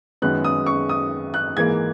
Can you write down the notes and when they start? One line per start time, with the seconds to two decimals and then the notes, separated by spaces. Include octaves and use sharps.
0.22 F#2 D#3 G#3 B3 F#6
0.44 D#6
0.66 C#6
0.89 D#6
1.34 F#6
1.56 G#2 E3 A#3 G#6